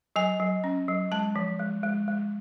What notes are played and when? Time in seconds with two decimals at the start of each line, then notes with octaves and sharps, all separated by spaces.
0.16 F#3 G#5
0.40 F#3
0.64 C#4
0.88 F#3
1.12 G#3 A5
1.36 F3
1.59 G#3
1.83 G#3
2.08 G#3